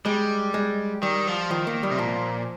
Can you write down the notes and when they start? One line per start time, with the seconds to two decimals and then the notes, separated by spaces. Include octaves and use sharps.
0.05 G3 G#3
0.54 G#3
1.03 D#3 G3
1.27 F3
1.51 D#3 F3
1.67 A#3
1.83 G3
1.91 C3
1.99 A#2 F3